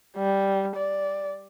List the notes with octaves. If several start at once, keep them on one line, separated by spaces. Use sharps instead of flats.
G3
D5